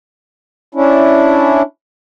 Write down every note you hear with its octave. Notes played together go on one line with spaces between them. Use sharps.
C#4 D4 E4